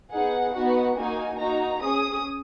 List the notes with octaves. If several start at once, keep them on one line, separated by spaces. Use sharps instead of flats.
B3 D#4 G#4 F#5
B3 D#4 F#4 F#5
A#3 D#4 F#4 G#5
A#3 D#4 F#4 A#5
C#4 G#4 D#6